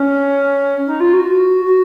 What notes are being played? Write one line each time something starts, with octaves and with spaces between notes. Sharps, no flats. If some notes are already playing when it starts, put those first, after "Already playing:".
Already playing: C#4
D#4
F4
F#4
F#4